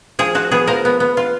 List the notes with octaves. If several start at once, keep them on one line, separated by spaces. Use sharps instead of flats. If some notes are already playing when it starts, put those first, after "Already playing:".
F3 G#4
F3 F#4
B3 G#4
F3 A#4
B3
B3
F4